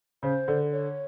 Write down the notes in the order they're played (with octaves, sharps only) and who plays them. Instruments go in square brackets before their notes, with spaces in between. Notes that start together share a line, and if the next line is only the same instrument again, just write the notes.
[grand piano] C#3 [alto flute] C5
[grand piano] D3
[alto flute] C#5